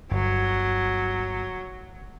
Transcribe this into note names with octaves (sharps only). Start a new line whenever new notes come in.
G1 F#3